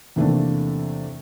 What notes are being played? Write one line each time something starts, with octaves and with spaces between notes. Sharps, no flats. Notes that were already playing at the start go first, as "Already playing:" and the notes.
E2 C3 A3 A#3 D4